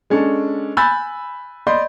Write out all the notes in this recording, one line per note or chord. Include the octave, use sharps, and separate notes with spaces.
G#3 C#4 D4 A4
G#5 B5 E6 F#6 G6 A6
D5 D#5 B5 C6 G6